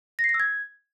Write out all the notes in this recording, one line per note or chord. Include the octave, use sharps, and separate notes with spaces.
A#6
C7
A#6
E6
G#6